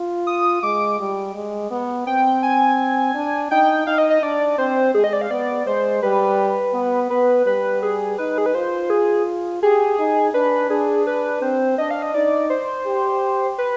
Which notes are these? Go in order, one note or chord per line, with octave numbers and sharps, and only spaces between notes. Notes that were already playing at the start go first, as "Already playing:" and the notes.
Already playing: F4
D#6
G#3 D6
G3
G#3
B3
C4 G5
G#5
D4
D#4 G5
D#4 F5
D#5
D#5
D4 D5
C4 C5
G#3 G#4
D#5
D5
F5
B3 D5
G#3 C5
G3 B4
B3
B3 B4
G3 B4
G#4
D#4 B4
G#4
B4
F4 C5
G#4
G4 G#4
D#4
D4 B4
D4 G#4
B4
C4 C5
D4 D#5
F5
D#5
D#4 D5
C5
G4
B4